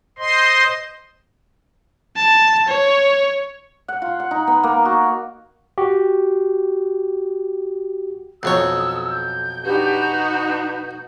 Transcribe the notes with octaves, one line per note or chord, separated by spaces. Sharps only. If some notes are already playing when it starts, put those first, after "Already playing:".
C5 D#5 C6
A5
C#5
F#5
F4
F#5
D#4
B3
A#3
F#4
F#4 G4
B1 F2 C#5 D#6 E6
G6
D4 D#4 F#4 G4 B4
B4